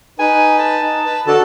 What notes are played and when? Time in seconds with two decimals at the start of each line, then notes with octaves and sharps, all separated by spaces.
0.19 D#4 B4 G#5
0.59 A5
0.82 D#4
1.06 B4
1.27 D3 F#4 A4 A5